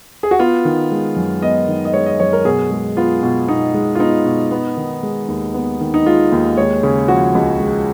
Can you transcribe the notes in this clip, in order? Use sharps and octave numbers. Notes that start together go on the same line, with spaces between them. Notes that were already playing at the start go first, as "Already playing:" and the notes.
G#4
F#4
B3 F4
D#3
G#3
F#2
B3 D#5
D#3
D#5
G#3 C#5
D#5
F#2 C#5
A#4
B2 G#4
G#3
B3 F4
B2
B2 D#4
G#3
F4
B3 D#4
B2
B3
D#3
G#3
D#2
B3
D#3
D#4
G#3 F4
D#2
G#3 C#5
C#3
F3 F#4
C#2
G#3